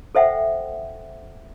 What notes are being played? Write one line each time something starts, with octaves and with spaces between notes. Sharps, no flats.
A4 C5 E5 F#5 G5